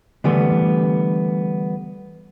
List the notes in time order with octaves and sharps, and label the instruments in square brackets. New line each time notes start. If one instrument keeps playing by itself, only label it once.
[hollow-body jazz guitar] D3 E3 G3 A3 B3